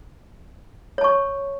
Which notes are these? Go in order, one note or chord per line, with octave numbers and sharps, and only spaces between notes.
C#5 A5 C#6